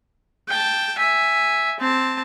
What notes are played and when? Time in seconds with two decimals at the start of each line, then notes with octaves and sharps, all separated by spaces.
0.49 G5 A5
0.98 E5 G#5
1.80 C4 A5